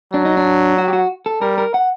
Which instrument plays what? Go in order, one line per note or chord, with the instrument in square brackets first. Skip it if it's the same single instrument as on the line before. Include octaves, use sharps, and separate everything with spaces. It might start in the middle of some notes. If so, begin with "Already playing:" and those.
[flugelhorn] F#3 [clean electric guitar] D4
[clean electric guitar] D#4
D4
F#4
G4
F#4
A4
[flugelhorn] G3 [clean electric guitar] A#4
[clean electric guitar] A#4
F#5